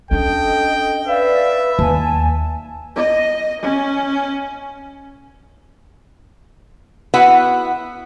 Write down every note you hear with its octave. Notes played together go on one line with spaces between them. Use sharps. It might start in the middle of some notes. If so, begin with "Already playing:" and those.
C#4 D4 A4 D#5 G5
B4 D5 E5 F5
D#2 G#5 A5
D#5
C#4
B3 E4 F#4 B4 F#5